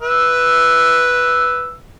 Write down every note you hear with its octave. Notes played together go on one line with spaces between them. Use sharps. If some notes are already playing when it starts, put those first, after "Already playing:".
B4 E5 E6